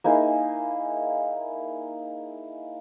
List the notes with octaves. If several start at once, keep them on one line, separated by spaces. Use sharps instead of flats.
A#3 D#4 E4 G#4